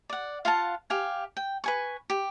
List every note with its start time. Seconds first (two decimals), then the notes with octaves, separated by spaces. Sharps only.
0.10 D5 F#5
0.45 F4 F5 F#5 A5
0.90 G4 F5 G#5
1.37 G5
1.64 B4 G#5 C#6
2.10 G4